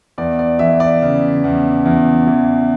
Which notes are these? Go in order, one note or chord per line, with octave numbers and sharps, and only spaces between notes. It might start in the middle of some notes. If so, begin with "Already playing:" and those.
E2 D5
D5
E3 E5
D5
C#3
E2
E2
E3